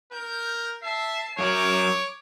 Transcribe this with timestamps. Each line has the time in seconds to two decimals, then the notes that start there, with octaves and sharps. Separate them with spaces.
0.12 A#4 G6
0.83 E5 A5 C7
1.39 F#2 F#3 A#4 C#5 D6